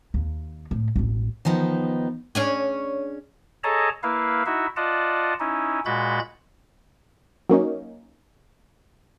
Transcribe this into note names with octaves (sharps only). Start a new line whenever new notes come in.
D#2
A2
E1 A1
D#3 F3 B3 D#4
C#4 D4 G#4
G#4 A4 C#5 D#5 A5 A#5
A#3 E4 B4 F5
D#4 E4 F#4 E5
F4 D5 D#5 F#5 A5
C#4 D#4 E4
A#2 G#3 F#4 B5 G6 A6
F#3 A#3 C#4 D#4